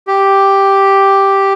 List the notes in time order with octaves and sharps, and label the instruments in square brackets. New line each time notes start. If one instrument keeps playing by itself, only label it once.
[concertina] G4